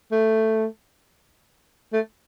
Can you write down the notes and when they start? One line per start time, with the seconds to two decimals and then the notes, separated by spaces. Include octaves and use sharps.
0.12 A3
1.93 A3